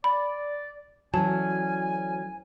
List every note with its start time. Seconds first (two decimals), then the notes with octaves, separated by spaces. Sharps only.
0.04 D5 B5
1.14 D2 E3 F#3 C#4 G#5 A5